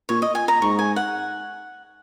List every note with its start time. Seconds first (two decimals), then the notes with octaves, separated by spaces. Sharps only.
0.09 A#2 C#5
0.22 D#5
0.35 G#5
0.48 A#5
0.62 G#2 C#6
0.79 G#5
0.96 F#5